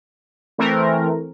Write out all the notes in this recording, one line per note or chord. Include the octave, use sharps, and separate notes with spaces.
E3 A3 C4 A#4